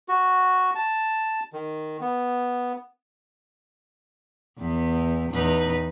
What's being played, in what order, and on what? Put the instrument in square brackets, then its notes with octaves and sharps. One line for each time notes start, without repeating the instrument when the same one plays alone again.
[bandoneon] F#4
A5
D#3
B3
[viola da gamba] E2 B3
E2 D#4 B4